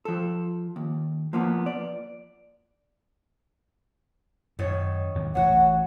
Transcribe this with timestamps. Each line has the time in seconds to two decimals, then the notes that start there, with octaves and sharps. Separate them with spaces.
0.05 F3 A4
0.76 D#2
1.33 F3 A#3 B3
1.66 D5
4.59 F#2 D#3 C#5
5.15 D#2 C3 F#3
5.35 A1 F#4 C#5 F#5